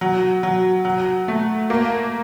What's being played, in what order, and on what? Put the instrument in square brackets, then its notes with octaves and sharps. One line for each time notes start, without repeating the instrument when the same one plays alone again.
[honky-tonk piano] F#3
F#3
F#3
A3
A#3